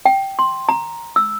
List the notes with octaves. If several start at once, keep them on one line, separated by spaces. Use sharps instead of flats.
G5
C6
A#5
E6